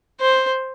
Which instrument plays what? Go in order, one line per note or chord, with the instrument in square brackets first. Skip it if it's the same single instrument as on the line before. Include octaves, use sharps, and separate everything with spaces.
[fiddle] C5